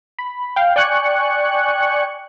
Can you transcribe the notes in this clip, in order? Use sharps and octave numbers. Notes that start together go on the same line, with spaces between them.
B5
F5 G5
D5 G5 G#5 C#6 F#6 C#7